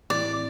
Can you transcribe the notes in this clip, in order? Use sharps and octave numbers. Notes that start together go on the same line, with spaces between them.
A2 E3 C4 E4 D5